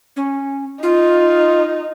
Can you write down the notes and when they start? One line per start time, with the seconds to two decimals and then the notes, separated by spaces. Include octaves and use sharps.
0.16 C#4
0.83 D#4 F4